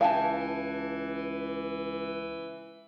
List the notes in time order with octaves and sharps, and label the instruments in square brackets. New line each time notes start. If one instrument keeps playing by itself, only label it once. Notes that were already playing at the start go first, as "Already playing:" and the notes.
[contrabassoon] C#2 [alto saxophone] E3 [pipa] E4 G#5 A5 [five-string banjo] G4 F5